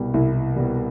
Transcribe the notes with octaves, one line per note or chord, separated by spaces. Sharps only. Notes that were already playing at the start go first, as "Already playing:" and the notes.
Already playing: C2 B2 G3
C2 E4
B2 G3